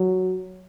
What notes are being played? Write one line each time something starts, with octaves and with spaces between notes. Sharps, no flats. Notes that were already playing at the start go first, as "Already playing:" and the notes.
Already playing: F#3